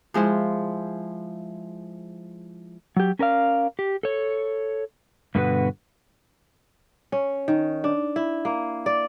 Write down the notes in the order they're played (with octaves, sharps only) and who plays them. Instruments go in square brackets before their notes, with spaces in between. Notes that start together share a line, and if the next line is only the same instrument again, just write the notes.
[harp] F3 G#3 E4 C5
[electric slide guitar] F#3 G4
C#4 A#4 D5 F5
G4
A4 C#5
G2 B2 D3 B3 F#4 B4
[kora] C#4
D#3
D4
E4
A#3
D5